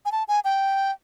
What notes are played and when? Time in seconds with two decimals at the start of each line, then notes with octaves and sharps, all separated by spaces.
0.05 G#5
0.12 A5
0.28 G#5
0.45 G5